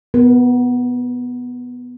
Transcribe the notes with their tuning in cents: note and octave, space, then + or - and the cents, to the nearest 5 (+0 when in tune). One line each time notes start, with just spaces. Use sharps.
B3 +0 A#4 +45